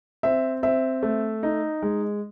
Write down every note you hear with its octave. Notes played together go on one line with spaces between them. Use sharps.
C4 E5
C4 E5
A3
D#4
G#3